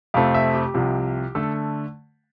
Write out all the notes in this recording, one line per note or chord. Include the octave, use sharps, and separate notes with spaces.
F2 C3 F3 A3 C4 F5
E5
G4
C2 C3 F3
D3 A3 A4